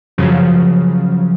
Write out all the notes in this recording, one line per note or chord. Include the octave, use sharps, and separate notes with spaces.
F#2 C#3 F3 F#3